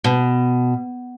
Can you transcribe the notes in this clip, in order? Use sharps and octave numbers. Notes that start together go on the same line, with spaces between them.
B2